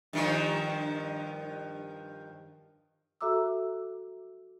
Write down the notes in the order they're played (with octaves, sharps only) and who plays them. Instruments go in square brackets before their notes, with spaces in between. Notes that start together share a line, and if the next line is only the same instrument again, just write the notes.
[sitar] G2 D#3 F3
[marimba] F#4 A4 E5 A#5 D6 E6